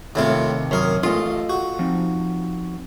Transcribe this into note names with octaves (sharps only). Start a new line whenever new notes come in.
D#2 A2 C3 E4 F4
F#2 A#4 C#5 B5 C6 D#6
A1 F4 A4 D#5
F#4
F3 C4 D#4